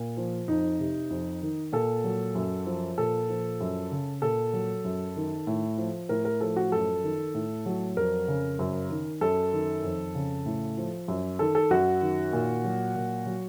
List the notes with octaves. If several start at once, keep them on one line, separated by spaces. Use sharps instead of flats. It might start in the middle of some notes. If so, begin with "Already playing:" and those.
Already playing: A#2
F3
F2 D#4
C3
F2
D#3
A#2 A4
F#3
F#2
F3
A#2 A4
F3
F#2
C#3
A#2 A4
F#3
F#2
D#3
A2
F3
A2 A#4
A#4
F3 A4
F#4
F#2 A4
D#3
A2
F#3
F2 A#4
C#3
F#2
D#3
F#2 A4
D#3
F2
C#3
A2
F3
F#2
D#3 A4
A4
F#2 F#4
D#3
A#2
F#3
A#2
F#3